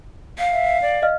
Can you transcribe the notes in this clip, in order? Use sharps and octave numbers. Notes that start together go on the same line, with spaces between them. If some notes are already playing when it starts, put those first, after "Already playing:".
F5
E5
D5
D#5 F5 F6